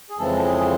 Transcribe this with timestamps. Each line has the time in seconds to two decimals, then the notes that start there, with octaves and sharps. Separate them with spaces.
0.10 G#4
0.18 F2 C#3 E3 G#3 C4 A4
0.45 G#4